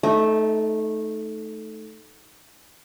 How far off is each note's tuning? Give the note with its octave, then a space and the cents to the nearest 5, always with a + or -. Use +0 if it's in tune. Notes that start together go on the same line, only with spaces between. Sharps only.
A3 -10 D#4 +0 E5 -45